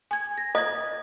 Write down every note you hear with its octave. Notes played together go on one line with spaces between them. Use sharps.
G#5 G#6
A#6
D#5 D#6 G#6